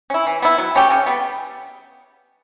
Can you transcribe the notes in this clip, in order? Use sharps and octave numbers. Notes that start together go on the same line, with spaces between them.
C#4 E4
E3
B3 E4
F#3
A3 C#4 G4
C#3
G3 B3